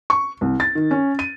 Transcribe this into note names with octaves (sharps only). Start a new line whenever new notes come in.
C#6
C2
A6
D#3
C#4
D#7